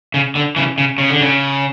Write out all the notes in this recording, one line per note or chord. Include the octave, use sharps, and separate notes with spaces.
C#3
D3
C#3 E3
C#3
C#3
D3
C#3